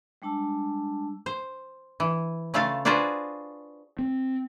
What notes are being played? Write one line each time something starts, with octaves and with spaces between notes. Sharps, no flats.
G3 G#3 D4 A5 E6
C5
E3
C#3 A3 F4 A4 F5
D4 F4 F#4 G#4 B4 C5
C4